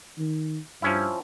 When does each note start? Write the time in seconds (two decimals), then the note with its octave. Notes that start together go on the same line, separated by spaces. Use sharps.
0.18 D#3
0.82 G2 F3 C#4 E4